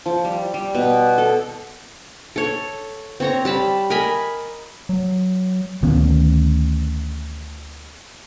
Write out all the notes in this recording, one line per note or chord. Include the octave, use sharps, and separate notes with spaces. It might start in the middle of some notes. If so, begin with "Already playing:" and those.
F3
G3
G3
B2
A4
A4 C#5
C4 C#5 A#5
G3 A5 B5
A#4 D#5 G#5 B5
F#3
D2 D#3 B3 C#4